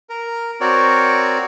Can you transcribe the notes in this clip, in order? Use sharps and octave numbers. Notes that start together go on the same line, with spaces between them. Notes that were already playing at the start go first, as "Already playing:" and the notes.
A#4
C4 F#4 A#4 C#5 D5